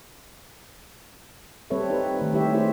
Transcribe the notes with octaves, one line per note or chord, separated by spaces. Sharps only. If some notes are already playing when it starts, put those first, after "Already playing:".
G3 C4 A4 B4 C#5 E5
D#4 G4 B4
D#3 A3
G3 E4 G4 C#5 E5
A3 E4 G4 G#4 C5